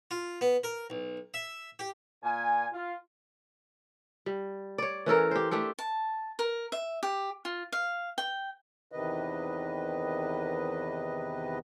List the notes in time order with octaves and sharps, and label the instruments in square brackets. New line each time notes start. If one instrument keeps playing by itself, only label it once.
[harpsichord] F4
B3
A#4
B1
E5
G4
[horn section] A#2 G#5
F4
[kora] G3
C#5 D5
E3 C#4 A4 A#4
G4 C5
A3 D4 G4 A4
[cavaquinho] A5
A#4
E5
G4
F4
F5
G5
[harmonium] E2 C3 D#3 B4 D#5